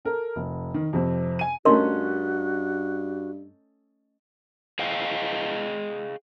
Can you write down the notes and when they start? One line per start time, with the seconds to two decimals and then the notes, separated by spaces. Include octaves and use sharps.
0.05 A4 A#4
0.36 F1
0.74 D#3
0.93 F2 C3 C4
1.39 G#5 D#7
1.65 G2 A3 C#4 D#4 F#4 A#4 C6
4.79 G#4 D#5 F5 G5